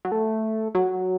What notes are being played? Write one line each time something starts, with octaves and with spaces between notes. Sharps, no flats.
F#3
A3
F#3